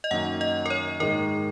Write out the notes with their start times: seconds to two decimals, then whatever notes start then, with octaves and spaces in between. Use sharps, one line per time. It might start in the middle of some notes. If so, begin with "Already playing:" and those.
0.04 D#5
0.11 F#2 D#3 A#3 F#5
0.41 D#5
0.66 A#4
0.70 C#5
1.00 G#2 D#3 G#3 D#4 A#4